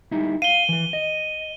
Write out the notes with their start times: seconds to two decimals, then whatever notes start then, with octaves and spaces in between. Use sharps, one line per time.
0.11 G3 D#4 E4
0.42 F5 D#7 G7
0.69 E3 B4
0.93 D#5